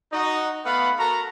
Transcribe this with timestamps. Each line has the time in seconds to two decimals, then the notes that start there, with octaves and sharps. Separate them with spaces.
0.13 D#4 F#4 D#5
0.64 A3 B3 B4 F5 F#5 B5
0.98 F#4 A4 A#4 A#5